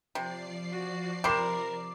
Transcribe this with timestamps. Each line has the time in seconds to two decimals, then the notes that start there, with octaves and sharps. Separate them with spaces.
0.15 C3 F3 D5 C7
0.73 F#4
1.24 C3 A#4 B5 C6 D6 E7